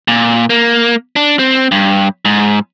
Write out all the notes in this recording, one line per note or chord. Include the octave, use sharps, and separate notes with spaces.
A#2
A#3
D4
C4
G2
G#2